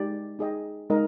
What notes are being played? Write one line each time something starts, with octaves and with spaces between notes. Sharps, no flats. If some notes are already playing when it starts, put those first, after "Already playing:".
Already playing: G#3 D#4 G4 D5
D#4 G#4 D#5 G5
G#3 D#4 A#4 D#5